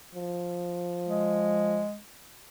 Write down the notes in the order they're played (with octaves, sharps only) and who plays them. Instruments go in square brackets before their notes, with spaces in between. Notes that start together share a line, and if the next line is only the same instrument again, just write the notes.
[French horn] F3
[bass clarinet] G#3